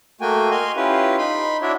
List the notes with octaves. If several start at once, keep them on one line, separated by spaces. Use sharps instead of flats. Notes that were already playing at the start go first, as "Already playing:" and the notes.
A3 A#3 F#4 G5 G#5
D#5 F5 G#5 C6
C#4 E4 F4 G4 B4
D#4 B5 C6
D4 E4 F#4 C#5 D5 E5